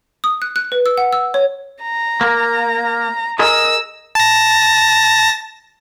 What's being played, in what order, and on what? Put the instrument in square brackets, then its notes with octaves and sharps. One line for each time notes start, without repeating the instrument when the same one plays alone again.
[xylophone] D#6
F#6
F#6
B4
E6
F#5
E6
C#5
[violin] A#5
[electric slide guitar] A#3
[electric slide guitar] G#4 A#4 D#5 [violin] E6
[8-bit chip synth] A5 A#6